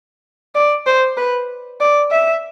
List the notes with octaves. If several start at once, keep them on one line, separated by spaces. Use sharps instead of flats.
D5
C5
B4
D5
E5